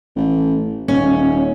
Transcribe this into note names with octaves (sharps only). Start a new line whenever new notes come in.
A1
D#1 C#4